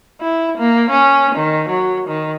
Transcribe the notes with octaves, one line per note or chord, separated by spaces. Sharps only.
E4
A#3
C#4
D#3
F#3
D#3